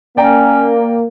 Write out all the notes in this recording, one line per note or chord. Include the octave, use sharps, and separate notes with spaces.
A#3 C#4 D5 G5 A#5